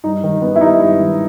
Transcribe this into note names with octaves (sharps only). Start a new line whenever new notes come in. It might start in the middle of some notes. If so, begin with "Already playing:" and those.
G2 D#4
D#3
B3
E4
G3 D#4
G2
D#3